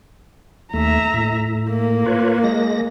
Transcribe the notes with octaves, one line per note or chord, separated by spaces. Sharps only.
D#2 A3 E5 A#5
A2
A#3
F4 B4 C#5
G#3 A#6